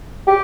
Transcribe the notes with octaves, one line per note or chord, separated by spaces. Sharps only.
G4